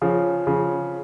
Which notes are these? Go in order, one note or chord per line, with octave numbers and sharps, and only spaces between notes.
C#3 F3
C#3 F3